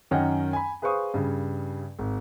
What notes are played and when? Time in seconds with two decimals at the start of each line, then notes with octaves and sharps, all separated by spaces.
0.11 F#2 D#3 C#4 C#5 F#5 G5
0.53 G#5 B5
0.82 G#4 B4 C5 F5 C#6 D#6
1.14 G2 C#3
1.99 G#1